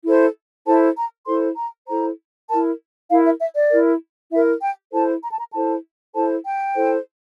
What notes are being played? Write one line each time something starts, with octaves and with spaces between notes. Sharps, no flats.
E4 A4 C5
E4 A4 C5 A5
A#5
E4 A4 C5 C6
A#5
E4 A4 C5 A#5
E4 A#4 A5
E4 A#4 F5
E5
E5
D5
E4 A#4
E4 A#4 E5
G5
E4 A4 C5 A5
A#5
A5
A#5
E4 A4 C5 A5
E4 A4 C5 A5
G5
E4 A4 C5